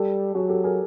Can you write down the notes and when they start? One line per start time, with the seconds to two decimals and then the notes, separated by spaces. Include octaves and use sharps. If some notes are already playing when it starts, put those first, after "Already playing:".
Already playing: G3 G4 A4
0.35 F#3 F#4 G#4
0.49 G4 A4
0.64 G#4 A#4